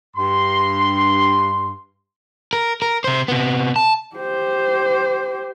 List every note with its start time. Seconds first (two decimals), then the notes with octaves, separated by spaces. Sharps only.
0.16 G2 C6
2.53 A#4
2.82 A#4
3.04 C3 C5
3.28 C3 B3
3.76 A5
4.16 G4 C5